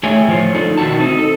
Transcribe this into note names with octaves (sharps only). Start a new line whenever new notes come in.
A3 E4 G#4 C#5 G5 G#5
A2 F3 F4 C5 C#5
D4 D#4 F4 A4
B2 D#3 E4 F#4 A5
C4 D#4
A4